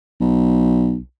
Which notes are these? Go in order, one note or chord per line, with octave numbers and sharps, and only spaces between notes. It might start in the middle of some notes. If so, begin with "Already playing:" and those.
B1